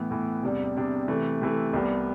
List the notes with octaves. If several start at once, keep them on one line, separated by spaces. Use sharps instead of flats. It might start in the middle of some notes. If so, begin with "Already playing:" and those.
Already playing: A2 E3 B3
A2 E3 B3
E2 C3 G3 D4
E2 C3 G3 D4
C3 E3 A3
C3 E3 A3
C2 C3 G3 B3